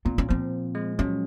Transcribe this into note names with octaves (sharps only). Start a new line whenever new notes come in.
A#2 C4
C#4
F3 C4
G#3
F#3 C#4